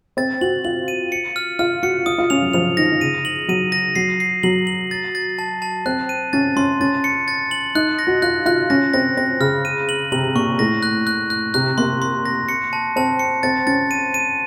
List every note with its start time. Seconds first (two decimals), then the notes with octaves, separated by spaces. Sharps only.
0.17 C4 A6
0.41 F#4 F#7
0.65 F4 F#7
0.88 D#7
1.12 C#7
1.36 F6
1.59 F4 F6
1.83 F#4 C#7
2.06 F4 D#6
2.18 F4
2.30 C#4 F7
2.42 F#3
2.53 F3 F7
2.77 D#3 A#6
2.91 D#3
3.01 C#3 D#7
3.25 F#7
3.48 F#3 D#7
3.72 A#6
3.96 F#3 C7
4.20 C7
4.43 F#3 F#7
4.67 F#7
4.91 A6
5.15 A6
5.39 A5
5.62 A5
5.86 C4 F#6
6.09 D#7
6.33 C#4 A6
6.56 C#4 C6
6.81 C#4 A6
7.04 C#7
7.28 A6
7.51 F#7
7.75 D#4 F#6
7.99 A#6
8.07 F#4
8.22 F4 F#6
8.46 F4 F#6
8.70 C#4 A#6
8.93 C4 A#6
9.17 C4 A#6
9.40 C#3 F6
9.65 D#7
9.89 F#7
10.12 C3 F#7
10.36 A#2 C#6
10.59 A2 A#6
10.83 F#6
11.07 F#6
11.30 F#6
11.54 C3 F#6
11.78 A#3 C6
12.02 C6
12.26 A#6
12.48 C#7
12.73 A5
12.96 C4 A5
13.19 C#7
13.43 C4 A6
13.67 C#4 A6
13.91 D#7
14.14 D#7